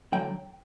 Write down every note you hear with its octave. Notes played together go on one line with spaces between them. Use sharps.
D3 F#3 G5